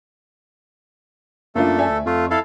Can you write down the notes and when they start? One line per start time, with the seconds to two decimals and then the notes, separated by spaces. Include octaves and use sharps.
1.55 F#2 A3 A#3 D4 F4 A4
1.78 D5 E5 G#5
1.90 D2
2.06 F2 A3 F4
2.31 E4 A4 F5